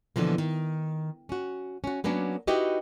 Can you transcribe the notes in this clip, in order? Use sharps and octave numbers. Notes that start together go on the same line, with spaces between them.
B2 D3 E3 F3 A#3
D#3
C#4 F#4
C#4 F#4
F#3 A#3 B3 C#4 D4
D#4 E4 F#4 G4 B4 D#5